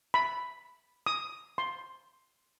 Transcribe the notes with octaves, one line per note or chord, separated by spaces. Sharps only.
B5
D#6
C6